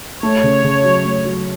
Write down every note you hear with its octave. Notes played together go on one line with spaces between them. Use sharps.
A3 C#5
C#3
C#3
F#3
A3
F#3